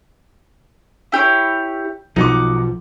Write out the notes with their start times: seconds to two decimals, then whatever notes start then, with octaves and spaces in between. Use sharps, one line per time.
1.12 E4 G4 C#5
2.16 B1 F3 D#4 F#5 D6